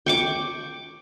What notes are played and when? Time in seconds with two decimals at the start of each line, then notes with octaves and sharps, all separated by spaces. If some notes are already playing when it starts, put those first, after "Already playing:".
0.06 G5 C#6 D6